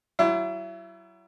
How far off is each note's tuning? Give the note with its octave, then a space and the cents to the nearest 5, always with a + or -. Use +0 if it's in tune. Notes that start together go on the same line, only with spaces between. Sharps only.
F#3 +35 E4 +30